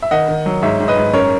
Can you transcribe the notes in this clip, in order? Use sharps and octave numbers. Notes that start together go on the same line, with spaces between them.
E5
D#3 D#5 F#5
D#3
F#3
G#2 C#5 E5
G#2
B4 D#5
G#2
F#2 A#4 C#5